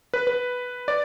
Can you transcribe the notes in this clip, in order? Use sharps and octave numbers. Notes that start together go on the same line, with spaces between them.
B4
B4
D5